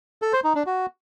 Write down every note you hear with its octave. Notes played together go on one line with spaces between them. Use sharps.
A4
C5
D#4
D4
F#4